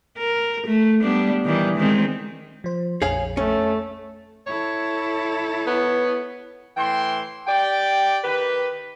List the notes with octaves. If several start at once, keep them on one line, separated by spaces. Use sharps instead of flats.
A#4
A3
G3 B3 D4
D#3 E3 G3
D#3 G#3 C4
F3 C5
A#1 F2 G#4 C#5 F5
A3 C#4
E4 A4 C#5
B3 C#5
A2 E3 G5 C6
G4 D5 G5
D#3 G4 B4